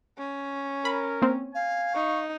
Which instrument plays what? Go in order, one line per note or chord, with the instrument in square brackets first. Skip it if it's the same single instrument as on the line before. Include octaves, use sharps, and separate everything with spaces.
[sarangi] C#4
[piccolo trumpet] A#4 [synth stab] B5
[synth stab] A#3 C4
[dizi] F5 [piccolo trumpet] G#5
[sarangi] D#4 [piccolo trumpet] C#6